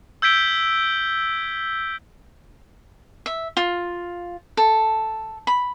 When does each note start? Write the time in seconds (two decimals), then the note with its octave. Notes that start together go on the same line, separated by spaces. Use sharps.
0.22 E6 G6 G#6 B6 D7 G7
3.26 E5
3.57 F4
4.57 A4
5.47 B5